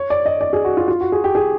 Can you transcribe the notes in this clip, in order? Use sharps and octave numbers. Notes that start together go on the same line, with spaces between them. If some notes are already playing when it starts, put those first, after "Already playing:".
Already playing: C#5
D5
D#5
D5
G#4
F#4
F4
F4
F#4
G#4
G4
G#4